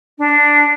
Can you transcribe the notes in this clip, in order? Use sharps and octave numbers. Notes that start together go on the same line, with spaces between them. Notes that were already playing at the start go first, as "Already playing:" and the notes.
D4